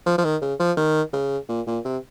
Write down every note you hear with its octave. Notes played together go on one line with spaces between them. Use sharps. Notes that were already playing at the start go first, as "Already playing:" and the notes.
F3
F3
D#3
C#3
F3
D#3
C#3
A#2
A#2
C3